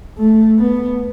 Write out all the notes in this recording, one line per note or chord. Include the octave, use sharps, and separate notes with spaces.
A3
B3